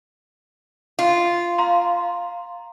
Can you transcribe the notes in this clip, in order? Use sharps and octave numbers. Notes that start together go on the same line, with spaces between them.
F4
F5 A#5 C6